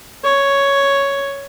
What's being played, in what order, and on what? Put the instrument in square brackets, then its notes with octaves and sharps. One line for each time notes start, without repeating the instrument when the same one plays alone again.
[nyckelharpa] C#5